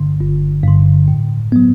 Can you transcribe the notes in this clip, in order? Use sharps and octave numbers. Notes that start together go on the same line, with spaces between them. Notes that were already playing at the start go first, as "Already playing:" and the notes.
Already playing: G1 G2 D3
G1
G2 D3
A2
F#3 B3